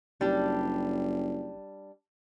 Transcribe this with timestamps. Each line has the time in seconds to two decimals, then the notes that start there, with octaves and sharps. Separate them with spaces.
0.21 F#1 G3 D4